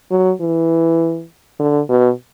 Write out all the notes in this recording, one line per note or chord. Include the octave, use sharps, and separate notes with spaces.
F#3
E3
D3
B2